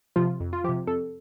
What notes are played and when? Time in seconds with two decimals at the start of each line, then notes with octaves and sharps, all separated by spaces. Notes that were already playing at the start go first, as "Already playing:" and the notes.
0.16 C3 F3 F4
0.40 F2
0.53 F4
0.64 F3 G4
0.69 C3
0.87 F2 A4